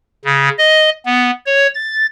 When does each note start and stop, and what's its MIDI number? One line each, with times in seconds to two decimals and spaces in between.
0.25 0.49 49
0.59 0.90 75
1.05 1.31 59
1.46 1.66 73
1.74 2.06 93